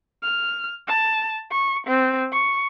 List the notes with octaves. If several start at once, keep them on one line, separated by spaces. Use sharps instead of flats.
F6
A5
C#6
C4
C#6